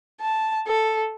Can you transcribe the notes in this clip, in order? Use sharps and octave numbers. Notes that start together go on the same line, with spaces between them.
A5
A4